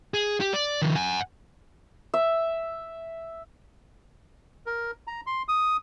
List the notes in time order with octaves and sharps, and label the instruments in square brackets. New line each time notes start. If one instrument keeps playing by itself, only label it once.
[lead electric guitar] G#4
G4
D5
D#3 F3
F#5 G#5
[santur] E5
[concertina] A#4
A#5
C6
D#6